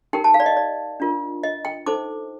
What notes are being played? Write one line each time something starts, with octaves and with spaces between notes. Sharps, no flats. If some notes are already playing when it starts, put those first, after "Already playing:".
D#4 G4 A#4 G5
A5
F5
D5
D#5
D5
D4 F4 A#4
D#5
G5
D#4 A4 C5 D6